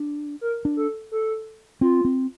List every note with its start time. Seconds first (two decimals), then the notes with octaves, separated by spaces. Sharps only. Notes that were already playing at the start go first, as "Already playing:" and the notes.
Already playing: D4
0.41 A#4
0.65 D4
0.77 A4
1.12 A4
1.81 C4 F4
2.05 C4